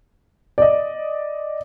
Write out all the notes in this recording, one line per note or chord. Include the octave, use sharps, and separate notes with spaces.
D5 D#5